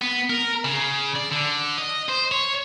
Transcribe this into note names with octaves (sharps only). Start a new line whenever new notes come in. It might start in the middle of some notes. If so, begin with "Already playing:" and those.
B3
A#4
C#3
D5
D3
D#5
C5
C#5